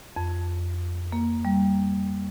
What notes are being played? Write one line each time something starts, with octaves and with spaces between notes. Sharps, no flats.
F2
A#3
G3